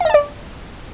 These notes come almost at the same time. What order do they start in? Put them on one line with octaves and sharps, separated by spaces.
F5 D#5 A5 D5